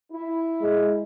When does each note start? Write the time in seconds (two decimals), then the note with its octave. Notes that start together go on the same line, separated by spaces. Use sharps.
0.12 E4
0.61 G#3